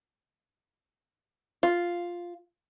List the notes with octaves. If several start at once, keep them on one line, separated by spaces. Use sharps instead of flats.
F4